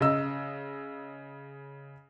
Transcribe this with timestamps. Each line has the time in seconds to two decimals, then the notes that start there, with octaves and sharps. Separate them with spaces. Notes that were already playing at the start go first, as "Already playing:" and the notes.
0.01 C#3 D#5 E6